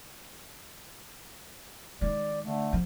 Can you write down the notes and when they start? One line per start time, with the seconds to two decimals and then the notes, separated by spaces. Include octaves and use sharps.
2.01 D#3 G#3 D5
2.45 D3 A3
2.73 F3